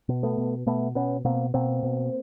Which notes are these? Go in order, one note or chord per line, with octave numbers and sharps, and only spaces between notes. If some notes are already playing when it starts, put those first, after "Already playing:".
B2
A3 B3
B2
B2 A3 B3
B2 B3 C#4
B2 A#3 C4
B2 A#3 C4
B2